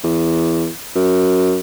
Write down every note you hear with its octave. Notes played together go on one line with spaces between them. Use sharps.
E2
F#2